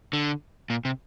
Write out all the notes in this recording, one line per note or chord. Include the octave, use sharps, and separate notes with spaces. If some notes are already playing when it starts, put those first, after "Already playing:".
D3
A#2
C3